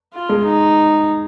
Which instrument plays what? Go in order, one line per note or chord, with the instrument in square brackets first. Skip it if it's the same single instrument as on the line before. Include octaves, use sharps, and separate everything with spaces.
[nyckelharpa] F4
[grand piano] G#3
[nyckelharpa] D#4